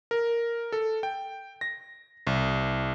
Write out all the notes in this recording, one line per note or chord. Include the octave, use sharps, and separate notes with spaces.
A#4
A4
G5
A#6
C2